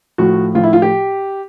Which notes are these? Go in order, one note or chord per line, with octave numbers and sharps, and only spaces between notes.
A2 F3 F#4
A2 F3 F4
E4
F4
G4